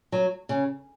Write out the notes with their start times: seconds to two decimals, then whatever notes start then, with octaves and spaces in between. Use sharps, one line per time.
0.12 F#3
0.49 C#3